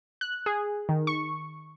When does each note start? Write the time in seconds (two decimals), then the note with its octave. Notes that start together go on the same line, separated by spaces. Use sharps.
0.21 F#6
0.46 G#4
0.89 D#3
1.07 C#6